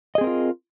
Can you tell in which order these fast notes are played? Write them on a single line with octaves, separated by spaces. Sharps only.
D#5 G#4 C4 A#4 F4